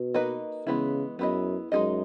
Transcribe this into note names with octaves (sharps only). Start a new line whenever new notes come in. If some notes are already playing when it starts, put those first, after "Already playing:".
Already playing: B2
A#3 D#4 F#4 B4 D#5
C#3 E3 G#3 B3 E4
F#2 B3 E4 G#4 D#5
F#2 G#3 D#4 G#4 D#5